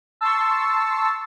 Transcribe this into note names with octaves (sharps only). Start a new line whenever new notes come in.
A5 C6 C#6 E6